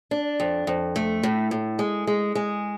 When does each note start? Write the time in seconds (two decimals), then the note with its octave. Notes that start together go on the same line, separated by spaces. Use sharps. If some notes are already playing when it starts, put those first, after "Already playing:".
0.11 D4
0.40 F2
0.67 F2
0.96 A3
1.23 A2
1.51 A2
1.79 G#3
2.07 G#3
2.35 G#3